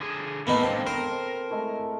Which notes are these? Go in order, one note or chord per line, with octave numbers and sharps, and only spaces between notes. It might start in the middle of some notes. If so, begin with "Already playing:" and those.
D3 G#4
A2 A#3 B3 D#4 A5 D6
G#3 C4 D4 A4 F5 G5
A#4 C5
G#3 A3 E4